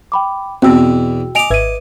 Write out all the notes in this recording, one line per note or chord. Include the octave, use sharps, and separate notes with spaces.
G5 B5 D6
E2 B2 C4 F#4 G5 E6
D#5 G#5 D6 D7 F7
G#1 B4 E5 G#6 D#7